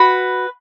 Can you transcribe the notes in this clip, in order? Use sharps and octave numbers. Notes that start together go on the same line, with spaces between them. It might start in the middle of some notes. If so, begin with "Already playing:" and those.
Already playing: F#4 B4 B5